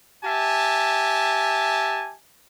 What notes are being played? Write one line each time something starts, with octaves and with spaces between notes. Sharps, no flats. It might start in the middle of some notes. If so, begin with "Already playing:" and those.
G4 E5 G#5 A5